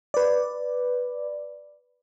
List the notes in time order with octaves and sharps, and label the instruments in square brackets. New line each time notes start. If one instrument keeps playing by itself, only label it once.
[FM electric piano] B4 D5